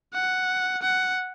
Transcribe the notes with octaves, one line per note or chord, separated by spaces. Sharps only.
F#5
F#5